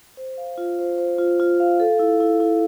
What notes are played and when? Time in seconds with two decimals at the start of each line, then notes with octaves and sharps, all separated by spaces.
0.17 C5
0.37 F5
0.58 F4
0.79 C5
0.98 C5
1.19 F4
1.40 F4
1.60 F5
1.80 A4
1.99 E4
2.20 E4
2.40 E4